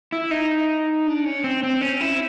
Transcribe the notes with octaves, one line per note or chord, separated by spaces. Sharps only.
E4
D#4
D4
C#4
C4
C4
C#4
E4